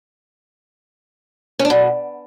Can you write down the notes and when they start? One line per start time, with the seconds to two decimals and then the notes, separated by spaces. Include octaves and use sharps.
1.59 C#4
1.65 D4
1.70 B2